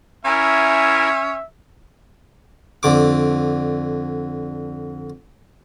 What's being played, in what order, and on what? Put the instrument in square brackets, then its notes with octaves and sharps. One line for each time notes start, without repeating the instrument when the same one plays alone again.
[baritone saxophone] C#4 [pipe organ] E4 A#4 G#5 [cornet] E5
[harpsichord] F2 D3 D6